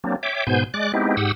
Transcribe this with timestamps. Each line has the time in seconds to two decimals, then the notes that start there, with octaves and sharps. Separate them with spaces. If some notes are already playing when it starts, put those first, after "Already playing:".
0.04 F#3 A#3 C4 D4
0.23 C#5 E5 G5 D6
0.47 G#2 B2 B3 C5 G#5 G6
0.74 G#3 D5 D6 F#6
0.94 G#3 B3 C4 D#4 E4 G4
1.17 G#2 G4 F#5 D#6 E6